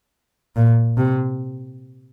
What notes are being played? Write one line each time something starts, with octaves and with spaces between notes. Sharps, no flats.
A#2
C3